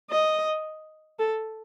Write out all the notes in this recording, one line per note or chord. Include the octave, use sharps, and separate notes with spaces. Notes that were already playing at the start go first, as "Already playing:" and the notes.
D#5
A4